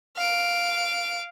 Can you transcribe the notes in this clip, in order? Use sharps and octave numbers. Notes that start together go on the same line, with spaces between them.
F5 D7